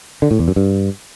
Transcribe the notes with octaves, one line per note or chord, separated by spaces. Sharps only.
D3
A2
E2
F#2
G2